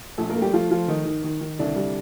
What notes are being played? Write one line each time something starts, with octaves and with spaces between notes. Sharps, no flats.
A#1 A3 A4
A#3 A#4
A3
G3 G4
F3 A3 F4
F3 A3 F4
D#3 D#4
D#3
D#3
D#3
C2 D3 D4
G3